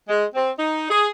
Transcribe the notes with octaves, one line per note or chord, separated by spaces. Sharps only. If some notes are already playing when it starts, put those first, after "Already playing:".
G#3
C4
D#4
G#4